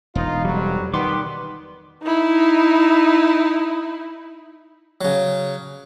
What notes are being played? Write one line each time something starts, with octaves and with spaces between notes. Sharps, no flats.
E1 D#4 F4
F2 F#3 G3
D#3 G3 B3 C6 D6
D#4 E4
C#3 F#3